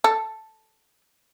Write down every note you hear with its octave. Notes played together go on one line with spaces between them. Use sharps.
A4